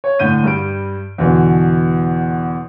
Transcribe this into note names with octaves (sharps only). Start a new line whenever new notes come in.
C#5
A2 D3 G6 D#7
G2 G3 D7
E2 B2 D3 E3